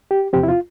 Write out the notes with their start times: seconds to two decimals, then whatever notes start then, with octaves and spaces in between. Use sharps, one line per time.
0.11 G4
0.33 E2 C3 F3 C4 G4
0.43 E4
0.49 F4